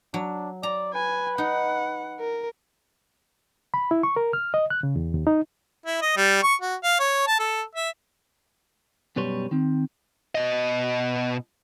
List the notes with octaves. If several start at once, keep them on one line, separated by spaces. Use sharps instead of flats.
F#3 D4
D5 A#5
B4 G#5
D#4 F#5
A#4
B5
E4
C#6
A#4
F6
D#5
F#6
C#3
E2
D#2
D#4
E4
D#5
G3
C#6
F#4
F5
C#5
A5
A4
E5
F#2 B2 G3 B4 C#5 C6
D#3 C4
B2 D#5